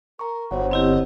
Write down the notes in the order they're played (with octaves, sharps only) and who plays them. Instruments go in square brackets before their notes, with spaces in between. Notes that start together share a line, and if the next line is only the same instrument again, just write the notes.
[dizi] A#4 [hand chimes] A#5 C#6
[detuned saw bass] G1 [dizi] F#4 [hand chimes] C5 C#5 F#5
[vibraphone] C4 E4 G4 [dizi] D#5